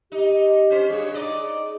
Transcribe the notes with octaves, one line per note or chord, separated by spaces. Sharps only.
D#4 G4
C#4 C5
G2 G#4 C#5
D#4 D5 D#5